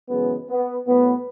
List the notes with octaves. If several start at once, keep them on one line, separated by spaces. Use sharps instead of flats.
F#2 C#3 E3 G#3 B3
B3
A2 F#3 B3